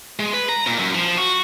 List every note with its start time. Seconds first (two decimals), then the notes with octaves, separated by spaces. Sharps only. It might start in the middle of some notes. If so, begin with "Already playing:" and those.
0.20 G#3
0.33 B4
0.49 A#5
0.67 A#2
0.79 F#2
0.95 F3
1.18 F#4